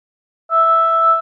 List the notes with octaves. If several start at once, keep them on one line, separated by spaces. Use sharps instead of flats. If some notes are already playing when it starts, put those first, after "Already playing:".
E5